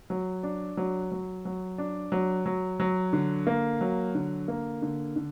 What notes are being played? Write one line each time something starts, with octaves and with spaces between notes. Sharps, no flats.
F#3
D4
F#3
F#3
F#3
D4
F#3
F#3
F#3
D3
A#3
F#3
D3
A#3
D3
D3